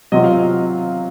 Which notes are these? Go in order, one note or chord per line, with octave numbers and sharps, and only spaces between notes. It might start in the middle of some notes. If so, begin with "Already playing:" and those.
C3 F#3 C4 F4 D#5
F5
D#5